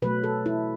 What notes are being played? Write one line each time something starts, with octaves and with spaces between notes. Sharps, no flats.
B2 F#3 A3 B4
A4
E4